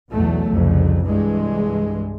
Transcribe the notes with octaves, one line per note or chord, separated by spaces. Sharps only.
B1 E2 B2 F#3 A3
C2 F2 C#3
C2 G2 E3 G#3